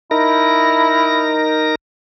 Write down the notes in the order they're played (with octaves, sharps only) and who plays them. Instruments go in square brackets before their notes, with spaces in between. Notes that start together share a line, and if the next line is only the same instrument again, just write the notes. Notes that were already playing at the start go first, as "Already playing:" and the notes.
[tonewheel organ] D#4 A#4 A#6 [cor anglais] E4